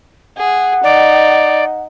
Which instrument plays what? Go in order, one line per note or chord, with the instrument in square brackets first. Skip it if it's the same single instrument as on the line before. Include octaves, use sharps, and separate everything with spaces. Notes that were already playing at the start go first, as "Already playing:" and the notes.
[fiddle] G#4 [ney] F#5
[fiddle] D#4 [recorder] D5